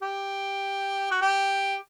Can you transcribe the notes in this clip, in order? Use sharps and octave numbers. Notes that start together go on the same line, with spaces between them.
G4
F#4
G4